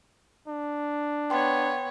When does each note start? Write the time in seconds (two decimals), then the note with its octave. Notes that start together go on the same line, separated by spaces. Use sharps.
0.48 D4
1.30 B3 C#5 G5 C6